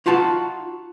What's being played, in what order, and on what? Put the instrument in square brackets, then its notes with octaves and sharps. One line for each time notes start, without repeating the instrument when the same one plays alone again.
[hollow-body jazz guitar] D#4 F4 F#4 A5